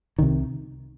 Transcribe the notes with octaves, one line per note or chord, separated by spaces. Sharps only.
C2 C3 D#3